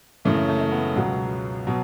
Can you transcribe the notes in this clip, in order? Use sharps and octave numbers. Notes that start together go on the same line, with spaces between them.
F#2 C#3 E3 A3
A3
A3
B3
C#2 B2 F#3
B2 F#3